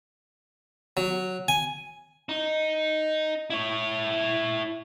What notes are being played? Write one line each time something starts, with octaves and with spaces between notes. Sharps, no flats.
F#3
G#5
D#4
E4 C#5